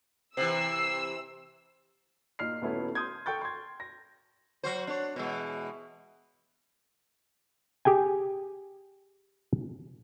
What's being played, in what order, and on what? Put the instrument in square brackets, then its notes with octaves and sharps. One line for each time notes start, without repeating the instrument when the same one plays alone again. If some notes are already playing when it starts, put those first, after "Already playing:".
[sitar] C3 E3 [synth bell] C5 E7 F#7 [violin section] E6 [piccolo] C7
[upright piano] A#2 D#4 F6 C7
D#1 B2 A3 B3 E4 C#5
C6 D#6 G6 G#6
A4 G5 C#6 G6 A6
C6 G#6
A#6
[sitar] F#3 F#4 C5
D4 C#5
B2 E3 G#3
[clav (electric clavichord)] G4 G#4 G5 G#5